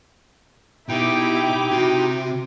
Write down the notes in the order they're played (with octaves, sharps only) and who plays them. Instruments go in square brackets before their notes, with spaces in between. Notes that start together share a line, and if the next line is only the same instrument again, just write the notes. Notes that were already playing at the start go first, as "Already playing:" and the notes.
[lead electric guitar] B2 [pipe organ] D#4 G5 [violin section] E4 G4 D6
[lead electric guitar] C3 [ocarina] F#4